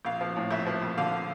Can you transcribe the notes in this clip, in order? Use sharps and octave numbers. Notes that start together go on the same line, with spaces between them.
A#1 F5
F3
A2
A#1 E5
F3
A#1
D3 F5